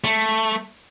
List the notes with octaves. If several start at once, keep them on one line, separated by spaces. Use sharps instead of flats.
A3